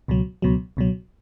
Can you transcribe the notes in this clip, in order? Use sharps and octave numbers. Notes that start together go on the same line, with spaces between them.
C#2 B2 F#3
C#2 B2 F#3
C#2 B2 F#3